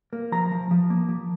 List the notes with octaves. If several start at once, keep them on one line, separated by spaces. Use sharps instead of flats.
A#3
F3 A#5
F3
F3
A#3
F3